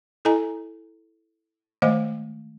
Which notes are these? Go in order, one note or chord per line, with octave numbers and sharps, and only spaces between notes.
E4 A4 D#5 G#5 A#5
D#3 G#3 A3 C5 D#5 F5